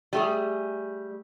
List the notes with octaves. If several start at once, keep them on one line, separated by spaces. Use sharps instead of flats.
G3 A3 G#4